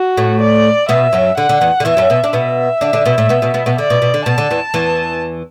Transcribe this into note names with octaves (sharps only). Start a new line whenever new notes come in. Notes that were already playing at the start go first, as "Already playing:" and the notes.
Already playing: F#4
A2 A3
D5
B2 B3 E5
F#2 F#3
D3 F#5
D3
E2 E3
D3
E2 E3 E5
F#2 F#3
B2 B3
D4
B2 B3 E5
D3 D4
D3 D4
B2 B3
A2 A3
B2 B3
B2 B3
B2 B3
B2 B3
D3 D5
B2
B2
D3
B2 A5
D3
E2 E3
E2 E3